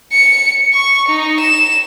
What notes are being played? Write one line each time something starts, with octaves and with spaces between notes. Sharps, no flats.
C#7
C#6
D#4
E7